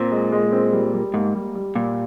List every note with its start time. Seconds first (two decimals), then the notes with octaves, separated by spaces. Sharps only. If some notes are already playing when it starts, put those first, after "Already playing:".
Already playing: A#2 C4
0.12 G#3
0.32 G#3
0.53 C4
0.73 G3
0.94 G3
1.14 G#2 A#3
1.35 G3
1.55 G3
1.75 A#2 G3